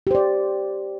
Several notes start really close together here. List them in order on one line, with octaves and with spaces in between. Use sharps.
G4 C5 D5